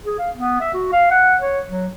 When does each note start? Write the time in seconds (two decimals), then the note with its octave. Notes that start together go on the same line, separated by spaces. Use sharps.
0.06 G#4
0.19 F5
0.36 B3
0.61 E5
0.74 F#4
0.93 F5
1.11 F#5
1.41 C#5
1.69 F#3